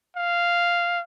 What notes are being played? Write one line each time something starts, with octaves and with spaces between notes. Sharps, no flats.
F5